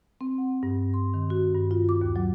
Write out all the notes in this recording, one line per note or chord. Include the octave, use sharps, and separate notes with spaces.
C4
F#5
G2
C6
D#3
F#4
G2
F4
D6
D#2
F#3